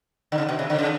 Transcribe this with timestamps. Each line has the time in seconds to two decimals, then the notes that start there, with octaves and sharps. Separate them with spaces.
0.32 D3
0.38 C#3
0.49 B2
0.59 C3
0.70 D3
0.79 C#3